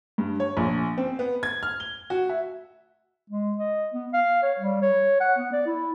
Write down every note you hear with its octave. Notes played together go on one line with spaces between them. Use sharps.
G2
C#5
A#1
C4
B3
G#6
F6
G7
F#4
E5
G#3
D#5
B3
F5
C#5
G3
C#5
F#5
B3
D5
E4